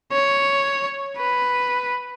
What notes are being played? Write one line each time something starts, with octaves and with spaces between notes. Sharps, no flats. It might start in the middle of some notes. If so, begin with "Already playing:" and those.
C#5
B4